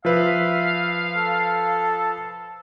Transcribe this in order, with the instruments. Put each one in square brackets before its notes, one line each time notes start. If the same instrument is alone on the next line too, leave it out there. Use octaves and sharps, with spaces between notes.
[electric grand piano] F3 B4 [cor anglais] E5 [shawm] F5
[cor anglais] A4